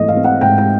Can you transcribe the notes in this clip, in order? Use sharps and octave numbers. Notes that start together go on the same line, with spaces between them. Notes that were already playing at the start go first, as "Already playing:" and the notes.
Already playing: G#2 E3 A3 C4 D#5
F5
C4
F#5
G#2 G5
G5